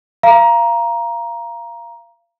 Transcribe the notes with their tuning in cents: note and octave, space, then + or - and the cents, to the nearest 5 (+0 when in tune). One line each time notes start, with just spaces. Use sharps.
F5 -25 A#5 +15